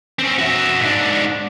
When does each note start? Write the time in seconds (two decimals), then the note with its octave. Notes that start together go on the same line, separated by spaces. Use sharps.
0.19 C4 C#4
0.38 F#4 E5
0.81 G#2 D4